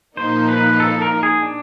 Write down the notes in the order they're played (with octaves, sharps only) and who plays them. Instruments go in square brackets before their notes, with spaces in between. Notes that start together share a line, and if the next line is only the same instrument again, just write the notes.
[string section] A#2 F3 A#3 D#4 [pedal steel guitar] C5
[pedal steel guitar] B4
A4
A#4
G#4
D4